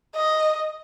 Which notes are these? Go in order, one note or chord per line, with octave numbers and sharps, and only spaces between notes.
D#5